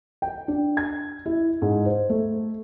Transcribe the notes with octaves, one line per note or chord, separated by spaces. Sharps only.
G5
D4
G#6
E4
G#2
C5
A3